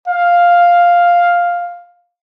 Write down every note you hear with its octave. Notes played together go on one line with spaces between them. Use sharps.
F5